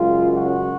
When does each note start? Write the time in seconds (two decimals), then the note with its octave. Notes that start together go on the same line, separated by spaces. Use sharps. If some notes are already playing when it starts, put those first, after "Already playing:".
Already playing: F#2 C#3 G#3 F4
0.35 F#4